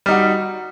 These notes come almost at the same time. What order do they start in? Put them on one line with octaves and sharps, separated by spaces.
G3 D#4 F#4